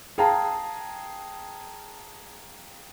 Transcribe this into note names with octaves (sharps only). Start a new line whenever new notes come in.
G#4 F5 G5 A5 A#5